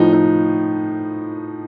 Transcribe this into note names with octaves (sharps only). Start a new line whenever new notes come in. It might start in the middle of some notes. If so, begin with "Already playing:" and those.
Already playing: A2 F3 D#4
D#4